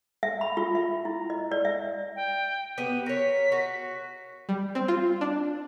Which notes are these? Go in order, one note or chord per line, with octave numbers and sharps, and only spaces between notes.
E5
B5
F4
E5
E4
D#5
D5
E5
G5
B3 G4 D#7
A#4 C#5 B6
F#4
G3
C4
F4
D4